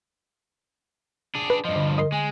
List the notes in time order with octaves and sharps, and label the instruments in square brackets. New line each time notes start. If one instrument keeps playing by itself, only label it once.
[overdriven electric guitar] D4 G#4
[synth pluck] B4
[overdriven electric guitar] G2 F3 [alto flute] D#5
[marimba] D3
[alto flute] A#4 [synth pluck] D#5 C6
[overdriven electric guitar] G#3 [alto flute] G#5